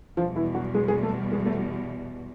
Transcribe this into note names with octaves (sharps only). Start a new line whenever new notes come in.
E2 B2 F3 G3 F4
E3 E4
F#3 F#4
G#3 G#4
G#3 G#4
A3 A4
G#3 G#4
A3 A4